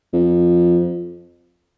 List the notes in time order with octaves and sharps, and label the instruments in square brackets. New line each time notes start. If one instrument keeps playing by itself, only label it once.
[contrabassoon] F2